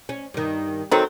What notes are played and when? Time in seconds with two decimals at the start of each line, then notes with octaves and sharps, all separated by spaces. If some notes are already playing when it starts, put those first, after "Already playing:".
0.09 C#4
0.34 G2 D#3
0.91 D#3 F#3 C4 F#4 A4